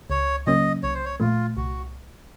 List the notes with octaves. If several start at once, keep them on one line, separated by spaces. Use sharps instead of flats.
C#2 C#5
C#3 F#3 A#3 C#4 D#5
C2 C#5
C5
C#5
A#2 F3 A3 F4
C2 F#4